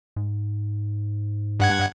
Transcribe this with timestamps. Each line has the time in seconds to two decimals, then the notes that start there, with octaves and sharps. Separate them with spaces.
0.16 G#2
1.60 G2 F#5 G#6